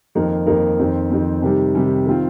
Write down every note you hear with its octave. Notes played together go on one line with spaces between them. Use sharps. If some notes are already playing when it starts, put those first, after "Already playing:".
F2 D#3 A#3 D#4 A#4
F2 D#3 A#3 D#4 A#4
F2 D#3 C4
F2 D#3 C4
C3 D#3 G3
C3 D#3 G3
D#3 C4 F4